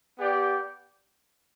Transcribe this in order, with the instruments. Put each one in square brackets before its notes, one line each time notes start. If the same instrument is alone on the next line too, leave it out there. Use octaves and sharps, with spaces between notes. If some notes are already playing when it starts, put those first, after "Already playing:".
[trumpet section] B3 G4 D5 G5